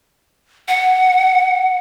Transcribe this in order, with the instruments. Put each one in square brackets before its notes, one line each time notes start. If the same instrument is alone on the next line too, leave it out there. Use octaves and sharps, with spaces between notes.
[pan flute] F#5